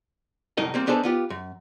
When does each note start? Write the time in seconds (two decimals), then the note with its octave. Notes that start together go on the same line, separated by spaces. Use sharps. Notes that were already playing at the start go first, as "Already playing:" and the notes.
0.57 C2 F#2 A2 D#4 A#4 D#5
0.74 G3 A#3 C4
0.87 B3 D4 D#4 G#4 A4 C5
1.03 B3 F4 G4
1.30 F#2